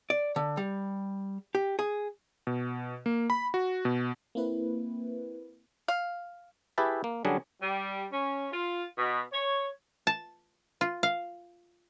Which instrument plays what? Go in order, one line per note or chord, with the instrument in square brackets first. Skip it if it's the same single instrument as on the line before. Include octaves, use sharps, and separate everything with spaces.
[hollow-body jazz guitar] D5
D3
G3
G4
G#4
[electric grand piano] B2
A#3
B5
F#4
B2
[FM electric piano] A#3 C4 E4 B4
[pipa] F5
[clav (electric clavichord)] E4 G4 G#4 B4 E5 A5
A#3
D3 F#3 G3 C#4 D4 G#4
[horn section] G3
C#4
F4
B2
C#5
[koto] A5
F4
F5